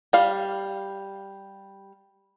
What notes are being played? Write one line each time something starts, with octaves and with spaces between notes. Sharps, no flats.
G3 F5